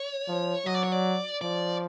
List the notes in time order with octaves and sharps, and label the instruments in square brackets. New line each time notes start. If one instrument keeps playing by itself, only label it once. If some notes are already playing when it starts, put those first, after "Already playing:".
Already playing: [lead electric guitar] C#5
[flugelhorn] F3
[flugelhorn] F#3 [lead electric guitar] D#5
[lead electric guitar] D5
C#5
D5
[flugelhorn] F3 [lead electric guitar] D5